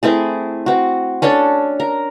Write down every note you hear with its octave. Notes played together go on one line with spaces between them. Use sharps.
A3 C4 E4 G#4
C4 F#4
C#4 D4 A4 C#5
A#4